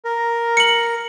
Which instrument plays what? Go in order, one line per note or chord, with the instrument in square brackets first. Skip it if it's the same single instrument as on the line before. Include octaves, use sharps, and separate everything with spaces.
[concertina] A#4
[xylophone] C#7 F#7